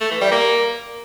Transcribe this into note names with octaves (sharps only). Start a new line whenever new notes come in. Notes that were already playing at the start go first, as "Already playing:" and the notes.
A3
E3
G3
A#3